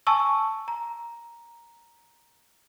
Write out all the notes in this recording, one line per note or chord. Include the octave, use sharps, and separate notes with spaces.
G#5 A5 C#6 E6
A#5